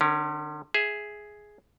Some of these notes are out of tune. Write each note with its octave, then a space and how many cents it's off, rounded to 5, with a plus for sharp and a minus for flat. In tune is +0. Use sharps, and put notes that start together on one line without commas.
D3 +40 C#4 +0 A#4 +0
G#4 +5 E5 +0